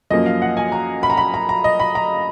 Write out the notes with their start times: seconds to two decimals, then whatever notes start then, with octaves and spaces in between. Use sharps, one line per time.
0.10 F#2 F3 A#3 D#5
0.26 F5
0.42 F#5
0.57 G#5
0.72 A#5
1.03 B5
1.10 A#5
1.17 B5
1.34 A#5
1.49 A#5
1.64 D#5
1.80 B5
1.95 A#5